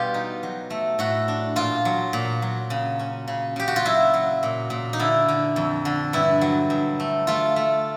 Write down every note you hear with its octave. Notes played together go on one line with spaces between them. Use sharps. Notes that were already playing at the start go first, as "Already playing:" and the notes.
Already playing: B2 G3 F4 G4
D#4
F#3
A3
A2 F#4
D4
A#2 F4
F#3
A#2
F#3
C#3
C#4
C#3
C#3 G4
F#4
F4
F#3 E4
F#3
A#2
A#2
D#4
D3 E4
D3
F2
D3
G2 E4
F#3
G2
A3
A3 F4
A3